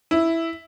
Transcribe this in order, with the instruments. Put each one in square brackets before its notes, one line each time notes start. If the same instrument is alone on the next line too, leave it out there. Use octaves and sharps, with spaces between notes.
[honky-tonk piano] E4